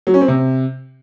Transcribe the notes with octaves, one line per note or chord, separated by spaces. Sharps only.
F#3
C#4
C4
C3